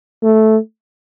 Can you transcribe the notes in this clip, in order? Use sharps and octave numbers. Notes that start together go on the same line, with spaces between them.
A3